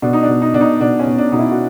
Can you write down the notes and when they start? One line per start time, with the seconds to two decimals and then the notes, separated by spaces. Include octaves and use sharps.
0.02 B2 D4
0.13 D#4
0.23 D4
0.28 B2
0.42 D#4
0.54 B2 D4
0.61 D#4
0.80 B2 D4
0.99 C#4
1.06 B2
1.18 D4
1.32 B2 D#4
1.38 E4
1.51 F#4